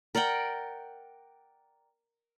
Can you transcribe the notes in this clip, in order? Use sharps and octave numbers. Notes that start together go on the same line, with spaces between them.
A#4 D5 F#5 G5